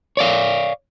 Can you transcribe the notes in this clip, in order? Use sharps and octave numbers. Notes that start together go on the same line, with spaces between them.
C#5 D5 F5